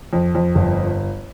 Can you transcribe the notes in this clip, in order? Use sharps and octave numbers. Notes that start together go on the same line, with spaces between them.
F2
F2
G1